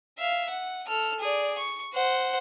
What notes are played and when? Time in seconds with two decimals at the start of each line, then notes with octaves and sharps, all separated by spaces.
0.19 E5 F5
0.50 F#5
0.87 A4 F6
1.21 G#4 D5
1.58 C#6
1.93 C5 F#5